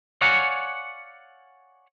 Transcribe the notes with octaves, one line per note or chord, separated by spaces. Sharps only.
C#5 D5 F5 F#5 G#5